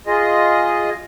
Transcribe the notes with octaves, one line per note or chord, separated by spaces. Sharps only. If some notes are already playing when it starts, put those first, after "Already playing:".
F4 G#4 D#5